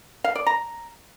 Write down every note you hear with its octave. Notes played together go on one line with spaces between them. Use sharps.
F5
D5
A#5